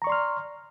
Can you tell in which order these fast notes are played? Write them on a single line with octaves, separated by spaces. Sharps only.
A#5 C#6 D5 C6 F6